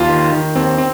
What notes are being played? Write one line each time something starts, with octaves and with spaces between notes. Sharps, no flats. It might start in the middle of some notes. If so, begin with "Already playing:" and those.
Already playing: D#2 F4
D#3
D#3
D#2 C4
C4